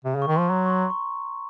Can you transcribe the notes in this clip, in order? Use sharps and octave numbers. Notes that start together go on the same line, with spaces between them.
C3
C#3
C#6
D#3
F3 C6
F#3 A#5
C#6
C6
C#6